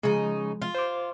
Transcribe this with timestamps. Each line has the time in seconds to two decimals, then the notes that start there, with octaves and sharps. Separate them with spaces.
0.03 C#3 F3 G#3 D#4
0.62 F4
0.75 C5 C6 D6